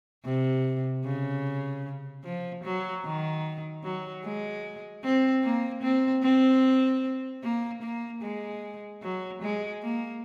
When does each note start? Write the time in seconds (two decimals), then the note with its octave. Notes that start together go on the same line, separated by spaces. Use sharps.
0.25 C3
1.05 C#3
2.25 F3
2.64 F#3
3.05 D#3
3.84 F#3
4.24 G#3
5.04 C4
5.44 A#3
5.83 C4
6.23 C4
7.43 A#3
7.83 A#3
8.22 G#3
9.03 F#3
9.42 G#3
9.83 A#3